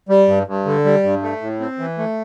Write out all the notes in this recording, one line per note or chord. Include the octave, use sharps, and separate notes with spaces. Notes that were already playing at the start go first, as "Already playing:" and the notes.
G3
G2
G2
D3
G3
G2
A3
A2
C4
E3
A3